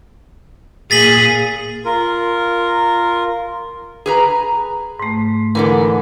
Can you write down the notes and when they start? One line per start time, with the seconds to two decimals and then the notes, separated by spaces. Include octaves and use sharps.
0.91 A#2 G#4 A6 B6 F#7
1.85 F4 A#4
4.06 G#4 B4 A#5
5.00 G#2 A3
5.55 G#2 D3 E3 A#4